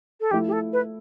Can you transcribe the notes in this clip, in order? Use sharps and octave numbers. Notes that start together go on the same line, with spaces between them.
A4
F3 A3 E4 G4
G4
A4
B4